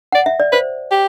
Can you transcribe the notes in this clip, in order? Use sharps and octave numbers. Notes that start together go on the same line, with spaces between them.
D5 F#5
E5
D5
B4 C5
G4